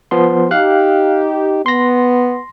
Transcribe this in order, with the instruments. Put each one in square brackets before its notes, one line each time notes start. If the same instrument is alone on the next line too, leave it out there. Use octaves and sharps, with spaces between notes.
[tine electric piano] F3 B3 C6
[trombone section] D#4 G4 [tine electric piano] F5 F#6
[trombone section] B3 [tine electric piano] C6 A#6